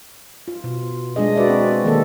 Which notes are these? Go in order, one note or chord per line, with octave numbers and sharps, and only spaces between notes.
F4
B2
G#3 D4 G#4 D#5
F#4 B4 D5 E5
C4 D5
D#3 A#3 A4